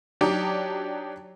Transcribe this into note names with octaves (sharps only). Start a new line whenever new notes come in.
F#3 D4 D#4 G4